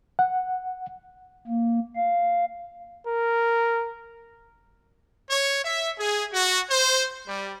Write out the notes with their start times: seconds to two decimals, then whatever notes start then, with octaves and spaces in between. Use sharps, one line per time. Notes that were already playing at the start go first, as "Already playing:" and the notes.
0.19 F#5
1.47 A#3
1.96 F5
3.07 A#4
5.30 C#5
5.65 E5
5.99 G#4
6.33 F#4
6.70 C5
7.28 G3